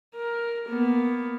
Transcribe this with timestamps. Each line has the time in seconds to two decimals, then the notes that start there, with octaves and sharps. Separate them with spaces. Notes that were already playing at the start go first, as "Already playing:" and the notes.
0.16 A#4
0.69 A#3 B3